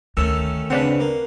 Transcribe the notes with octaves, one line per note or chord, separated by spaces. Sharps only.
D2 D#3 A3 C#4 E6
C#3 C4 D4 B4 F#5
A#3